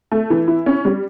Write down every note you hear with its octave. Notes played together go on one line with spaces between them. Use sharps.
A3
E3
E4
C#4
G3